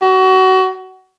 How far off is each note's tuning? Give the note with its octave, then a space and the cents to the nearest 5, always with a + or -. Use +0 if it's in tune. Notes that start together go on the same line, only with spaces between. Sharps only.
F#4 +25